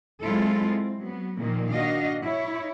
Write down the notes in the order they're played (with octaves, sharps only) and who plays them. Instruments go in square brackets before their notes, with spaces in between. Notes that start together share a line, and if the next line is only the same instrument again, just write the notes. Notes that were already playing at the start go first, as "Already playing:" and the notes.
[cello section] F#3 G#3 C4 E4 F4 A4
C4
F#3 B3
A#2 D#3 F3 A#3
D4 F#4 D#5 F5
E4 C#5